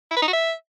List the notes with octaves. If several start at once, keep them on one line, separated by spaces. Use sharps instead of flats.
E4
B4
D#4
F#4
E5